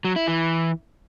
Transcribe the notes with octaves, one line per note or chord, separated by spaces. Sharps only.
F#3
E4
E3